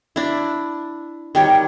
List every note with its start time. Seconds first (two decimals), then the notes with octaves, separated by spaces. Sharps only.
0.16 D4 E4
1.35 D#3 G3 C#5